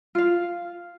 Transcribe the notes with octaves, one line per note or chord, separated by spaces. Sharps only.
F4 F5